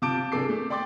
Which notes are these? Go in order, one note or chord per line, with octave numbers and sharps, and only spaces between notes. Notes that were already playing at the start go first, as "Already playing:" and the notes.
C3 F4 A5 D6 G6 D7
C3 D4 G#4 A4 D6 C7
A3
D5 G5 C6 D6 A6